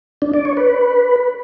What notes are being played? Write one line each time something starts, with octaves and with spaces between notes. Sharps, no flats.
D4
D5
C#5
B4